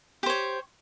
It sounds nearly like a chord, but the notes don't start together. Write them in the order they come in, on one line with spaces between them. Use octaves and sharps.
G4 C5 C#5